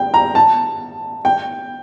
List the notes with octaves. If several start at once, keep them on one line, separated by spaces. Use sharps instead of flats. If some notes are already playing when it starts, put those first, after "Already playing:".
Already playing: G5
A#5
A5
G5